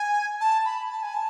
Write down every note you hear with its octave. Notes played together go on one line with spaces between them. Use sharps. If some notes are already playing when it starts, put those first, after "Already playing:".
Already playing: G#5
A5
B5
A5
G#5
A5